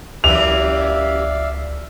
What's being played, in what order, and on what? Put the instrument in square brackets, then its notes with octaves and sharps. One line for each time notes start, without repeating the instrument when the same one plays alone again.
[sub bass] C#2 [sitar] F#2 E3 G4 [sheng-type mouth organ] D5 E5 F5 [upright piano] F7